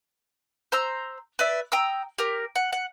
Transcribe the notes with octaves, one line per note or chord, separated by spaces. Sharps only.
C5 A#5 E6
B4 D5 E5
G5 A#5 D#6 E6
G4 A#4
F#5
F#5